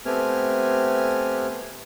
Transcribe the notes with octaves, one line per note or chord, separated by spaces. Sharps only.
A3 B3 C4 G4 G#5 F6